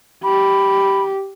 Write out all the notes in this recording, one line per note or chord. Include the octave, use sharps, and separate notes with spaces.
G4 B5